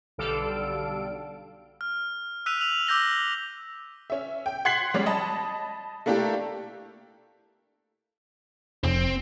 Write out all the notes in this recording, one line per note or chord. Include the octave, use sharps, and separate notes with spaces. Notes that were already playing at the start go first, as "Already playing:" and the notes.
B1 D3 G3 A4 F5 D7
F6
E6 F#6 B6 D#7 F7
E6 F7 F#7
D6 E6 G6 A#6 F#7 G7
C#4 E5
G5
F#5 C6 G#6 B6 C7 F#7
G3 G#3 C#4 D5
D#5 A5 B5
A3 A#3 D4 E4 G4
F1 C4